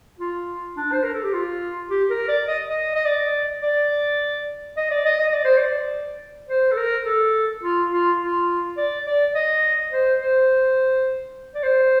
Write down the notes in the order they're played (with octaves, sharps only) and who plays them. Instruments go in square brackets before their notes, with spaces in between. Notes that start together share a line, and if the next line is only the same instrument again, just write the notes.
[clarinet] F4
D4
C5
A#4
A4
G4
F4
G4
A#4
D5
D#5
D#5
D#5
D5
D5
D#5
D5
D#5
D#5
D5
C5
D5
C5
A4
A#4
A4
F4
F4
F4
D5
D5
D#5
C5
C5
D5
C5